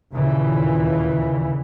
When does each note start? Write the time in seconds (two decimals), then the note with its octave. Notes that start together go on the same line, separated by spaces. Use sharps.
0.11 D#2 A#2 C#3 E3